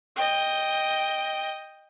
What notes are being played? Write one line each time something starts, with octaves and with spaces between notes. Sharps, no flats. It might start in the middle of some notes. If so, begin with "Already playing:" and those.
D#5 G5